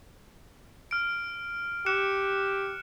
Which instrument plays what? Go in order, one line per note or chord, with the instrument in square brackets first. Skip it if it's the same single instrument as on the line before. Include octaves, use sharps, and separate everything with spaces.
[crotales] F6 D7
[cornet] G4 [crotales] F#6 C#7 E7